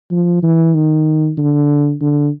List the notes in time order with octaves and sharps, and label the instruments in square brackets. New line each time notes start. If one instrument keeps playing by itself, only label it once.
[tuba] F3
E3
D#3
D3
D3